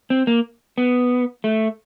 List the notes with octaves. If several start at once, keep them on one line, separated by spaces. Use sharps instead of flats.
C4
A#3
B3
A3